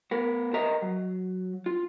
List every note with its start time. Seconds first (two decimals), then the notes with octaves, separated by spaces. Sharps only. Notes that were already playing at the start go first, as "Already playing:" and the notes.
0.11 B3 A#4
0.54 A#4 B4 D#5 E5 A#5
0.82 F#3
1.66 F4